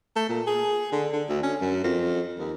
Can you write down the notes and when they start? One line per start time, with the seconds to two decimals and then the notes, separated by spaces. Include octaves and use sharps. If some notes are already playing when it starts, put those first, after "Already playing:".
0.16 A3
0.29 A#2
0.47 G#4
0.92 D3
1.13 D3
1.29 D2
1.43 C#4
1.61 F#2
1.84 F2
2.39 D#2